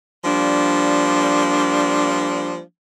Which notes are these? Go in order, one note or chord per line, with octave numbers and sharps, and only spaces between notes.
F3 G3 A#3 D4